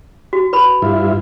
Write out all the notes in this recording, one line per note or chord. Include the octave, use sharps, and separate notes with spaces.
F#4
B4 B5
G2 E4 F4